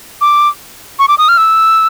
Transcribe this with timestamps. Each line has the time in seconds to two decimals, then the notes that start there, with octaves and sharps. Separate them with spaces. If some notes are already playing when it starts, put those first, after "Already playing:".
0.21 D6
0.99 C#6
1.08 D6
1.18 D#6
1.29 F6
1.38 E6